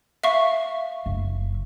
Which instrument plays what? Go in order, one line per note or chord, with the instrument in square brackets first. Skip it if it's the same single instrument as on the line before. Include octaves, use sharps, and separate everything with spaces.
[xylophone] E5 F5 C#6
[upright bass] F#1